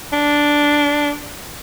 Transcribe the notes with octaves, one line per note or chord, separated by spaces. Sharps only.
D4